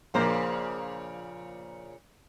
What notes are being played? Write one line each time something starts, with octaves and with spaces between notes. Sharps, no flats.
A#1 A#2 C#3 A#3 C5